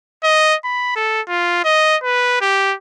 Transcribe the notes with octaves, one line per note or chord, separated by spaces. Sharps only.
D#5
B5
A4
F4
D#5
B4
G4